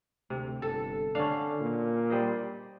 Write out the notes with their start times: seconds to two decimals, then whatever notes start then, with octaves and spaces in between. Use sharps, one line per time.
0.30 D2 C3
0.62 G1 A4
1.15 D3 C#4 D4 F5
1.61 A#2
2.10 G3 C5 D#5